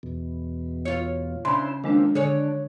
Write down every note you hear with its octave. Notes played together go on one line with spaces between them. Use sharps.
E2 B2
F4 C#5
C#3 D4 E4 C5 B5 C6
D#3 F3 G#3 A#3 C4 D4
D3 D4 G#4 C#5